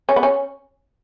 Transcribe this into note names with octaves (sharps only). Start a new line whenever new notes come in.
C#4
B3
C#4